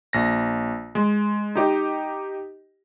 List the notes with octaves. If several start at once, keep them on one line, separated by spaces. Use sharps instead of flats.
A#1 A#6
G#3
D#4 G4 D#5